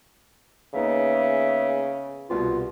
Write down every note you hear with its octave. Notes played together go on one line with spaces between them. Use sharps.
C#3 A#3 B3 D#4 E5
C2 B2 B3 F4